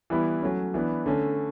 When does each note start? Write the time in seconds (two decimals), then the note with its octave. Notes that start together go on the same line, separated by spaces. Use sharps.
0.10 E3 G3 B3 E4
0.42 F#3 A3 C#4
0.74 E3 B3 D4
1.06 D3 A3 C#4